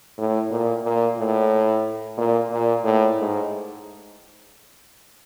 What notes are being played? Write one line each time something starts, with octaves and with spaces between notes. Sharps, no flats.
A2
A#2
A#2
A2
A#2
A#2
A2
G#2